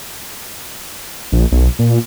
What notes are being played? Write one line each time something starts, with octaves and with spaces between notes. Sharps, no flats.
A#1
B1
A#2